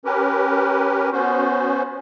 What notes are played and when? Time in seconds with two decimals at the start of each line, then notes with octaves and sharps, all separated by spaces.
0.05 C#4 G4 A#4 B4
1.12 B3 C#4 F#4 C5